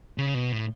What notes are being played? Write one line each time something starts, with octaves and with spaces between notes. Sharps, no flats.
C#3
B2
A2